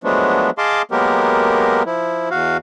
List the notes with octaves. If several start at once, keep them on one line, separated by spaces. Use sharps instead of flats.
F3 F#3 G#3 A3 B3 D4
G#4 D#5 F5 A5 C6 D6
F#3 G#3 A#3 B3 G4 A#4
F3 E4
E2 F#4 F5